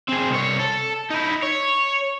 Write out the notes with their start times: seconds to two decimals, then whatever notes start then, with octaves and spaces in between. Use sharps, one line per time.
0.09 C4 G#4
0.31 C2 C#5
0.60 A4
1.11 D#4 E4
1.42 C#5